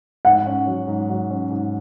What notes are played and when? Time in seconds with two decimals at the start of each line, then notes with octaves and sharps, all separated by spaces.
0.25 G#2 F#5
0.47 C#4
0.67 F#3
0.87 G#2
1.10 F#3
1.30 C#4
1.51 G#2